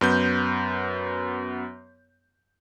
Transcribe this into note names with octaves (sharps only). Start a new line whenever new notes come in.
F#2 B3 G6